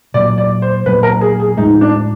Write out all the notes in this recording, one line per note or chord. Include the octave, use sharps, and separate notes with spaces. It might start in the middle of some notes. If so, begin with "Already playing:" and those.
A#2 F#3 A#3 D5
D5
C5
A#2 F#3 A#3 B4
A#4
G#4
G#4
A2 F3 G#3 D#4
D4